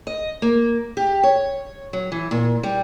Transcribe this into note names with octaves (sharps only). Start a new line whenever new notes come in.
D#5
A#3
G4
C#5
F#3
E3
A#2
G3